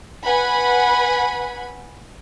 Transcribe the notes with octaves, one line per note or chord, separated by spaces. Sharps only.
B4 F#5 G#5 B5